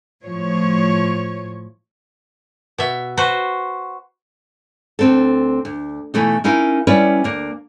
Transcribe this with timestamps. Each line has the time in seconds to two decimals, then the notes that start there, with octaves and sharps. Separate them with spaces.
0.25 A2 F3 C#5
2.78 B2 E5
3.17 F#4 B4 C5
4.99 D2 C4 A4
5.65 D2
6.14 B2 E3 A3 D#4
6.44 C#4 D#4 E4 A#4 F5
6.87 G3 C#4 E4 B4 C#5 D5
7.24 D2 A#3